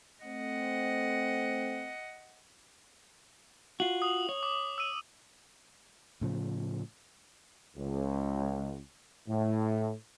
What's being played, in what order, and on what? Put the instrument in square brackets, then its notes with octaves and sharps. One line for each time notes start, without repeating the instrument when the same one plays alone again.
[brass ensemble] A3 C4 [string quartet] D#5 F#5
[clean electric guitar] F4 F#4 [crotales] F#7
[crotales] D#6
[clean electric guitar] C#5
[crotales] D6
E6 D#7
[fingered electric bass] A2 C#3 F3
[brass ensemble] C#2
A2